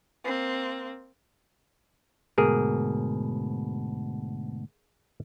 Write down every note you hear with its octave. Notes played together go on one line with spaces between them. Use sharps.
A#3 C4
D2 G#2 B2 G#4 A#4